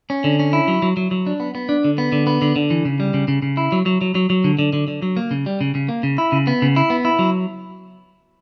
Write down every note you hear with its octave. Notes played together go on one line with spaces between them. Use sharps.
C#4
D3
C#4
E4
F#3
F#3
F#3
F#3
D4
B3
B3
D4
D3
B3
D3
B3
D3
D3
E3
C#3
G3
C#3
C#3
C#3
E4
F#3
F#3
F#3
F#3
F#3
D3
D3
D3
D3
F#3
A#3
C#3
G3
C#3
C#3
A#3
C#3
E4
C#3
B3
C#3
E4
B3
E4
F#3